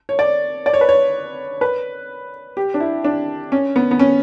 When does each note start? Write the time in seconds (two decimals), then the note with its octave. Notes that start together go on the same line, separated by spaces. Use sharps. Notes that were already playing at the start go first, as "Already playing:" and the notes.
0.09 C#5
0.19 D5
0.66 D5
0.74 C#5
0.81 B4
0.89 C#5
1.61 B4
2.57 G4
2.74 D4
2.80 E4
3.04 D4
3.52 C#4
3.76 B3
3.91 B3
3.99 C#4